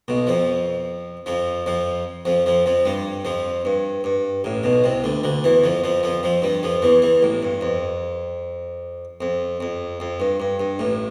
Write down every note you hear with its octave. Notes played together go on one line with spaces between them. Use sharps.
B1 B2
F2 F3
F2 F3
F2 F3
F2 F3
F2 F3
F2 F3
G2 G3
F2 F3
G2
G2
A1 A2
B1 B2
C2 C3
D2 D3
D2 D3
E2 E3
F2 F3
F2 F3
F2 F3
F2 F3
G2 G3
F2 F3
E2 E3
E2 E3
A1 A2
G2
F2
F2
F2
F2
G2
G2
G2
A1 A2